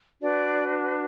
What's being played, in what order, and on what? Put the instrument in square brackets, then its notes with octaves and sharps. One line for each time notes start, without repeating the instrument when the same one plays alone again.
[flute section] D4 F#4 B4 D5